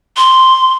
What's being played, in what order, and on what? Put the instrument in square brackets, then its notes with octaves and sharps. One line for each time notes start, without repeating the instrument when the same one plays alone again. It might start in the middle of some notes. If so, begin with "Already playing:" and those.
[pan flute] C6